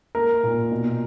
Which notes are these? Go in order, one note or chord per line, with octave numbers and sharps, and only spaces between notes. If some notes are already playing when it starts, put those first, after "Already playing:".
A#3 A#4
A#2
B2